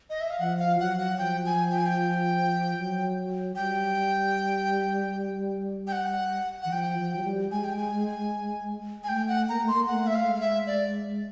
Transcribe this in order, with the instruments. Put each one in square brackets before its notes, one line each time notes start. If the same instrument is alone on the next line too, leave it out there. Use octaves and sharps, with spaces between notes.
[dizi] D#5
E5
F5
[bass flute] F3 [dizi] F#5
[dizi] F5
[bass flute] F#3 [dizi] F#5
[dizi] F#5
[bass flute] F3 [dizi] G5
[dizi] G#5
G5
G#5
G5
[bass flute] F#3
[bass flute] G3 [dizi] G5
[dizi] G5
F#5
[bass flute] E3 [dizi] F#5
[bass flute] F3 [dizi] G5
[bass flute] F3
F#3
G3
[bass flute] G#3 [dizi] G#5
[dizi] G5
G#5
G#5
[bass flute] A3 [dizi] G5
[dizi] F#5
[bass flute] A#3 [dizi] A#5
[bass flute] A3
[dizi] C6
[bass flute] A#3
[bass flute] A3 [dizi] F#5
[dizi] E5
F5
[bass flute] G#3
[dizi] F5
E5
D5